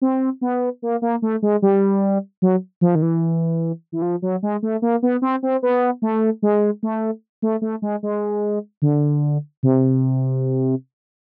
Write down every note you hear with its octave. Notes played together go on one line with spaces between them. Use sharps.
C4
B3
A#3
A#3
A3
G#3
G3
F#3
F3
D#3
E3
E3
F3
F#3
G#3
A3
A#3
B3
C4
C4
B3
A3
G#3
A3
A3
A3
G#3
G#3
D3
C3